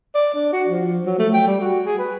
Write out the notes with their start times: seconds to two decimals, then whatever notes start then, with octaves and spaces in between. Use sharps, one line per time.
0.15 D5
0.34 D4
0.52 F#4
0.68 F3
1.06 F#3
1.19 A3
1.33 G5
1.47 G3
1.61 F#4
1.85 G#4
1.98 B4